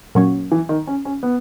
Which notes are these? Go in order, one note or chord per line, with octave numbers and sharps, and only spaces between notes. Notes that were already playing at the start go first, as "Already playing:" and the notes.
A#2 F#3 C#4
E3
D#3
C#4
C#4
B3